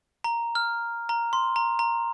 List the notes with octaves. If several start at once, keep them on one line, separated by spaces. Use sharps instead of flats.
A#5
F6
A#5
C6
A#5
A#5